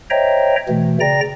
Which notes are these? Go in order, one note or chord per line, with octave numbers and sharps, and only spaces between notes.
C5 C#5 D#5 E5 G5 A#5
B2 E3 A3
C#3 D5 G5 A#5 A#6